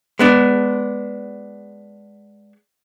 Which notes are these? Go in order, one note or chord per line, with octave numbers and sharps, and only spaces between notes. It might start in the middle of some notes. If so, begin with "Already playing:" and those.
G#3 B3 D4